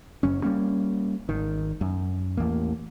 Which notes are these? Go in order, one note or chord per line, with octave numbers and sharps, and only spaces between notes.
F#1 F#2 C#4
G3 A#3 C#4
G#1 D#3
F#2
A1 E2 A#3